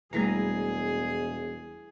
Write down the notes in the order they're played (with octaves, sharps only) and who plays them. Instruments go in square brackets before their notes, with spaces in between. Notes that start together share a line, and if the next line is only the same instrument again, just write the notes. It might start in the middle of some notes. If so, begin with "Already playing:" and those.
[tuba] E1 [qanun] E3 A#5 [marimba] G3 A3 A#3 [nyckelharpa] G#4